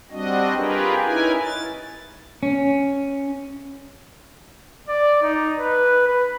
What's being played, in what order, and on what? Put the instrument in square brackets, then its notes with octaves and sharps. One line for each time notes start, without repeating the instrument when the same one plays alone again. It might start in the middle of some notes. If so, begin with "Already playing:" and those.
[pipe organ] G3 C4 D4 F#4 D#5
F4 G4 G#4 A#4 B4
C#4 D#4 E4 A#4 B4 G#5
A6
[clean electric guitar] C#4
[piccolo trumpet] D5
D#4
B4
B4